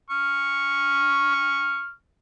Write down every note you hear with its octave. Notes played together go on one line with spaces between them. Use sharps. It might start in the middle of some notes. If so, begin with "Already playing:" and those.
C#6 F6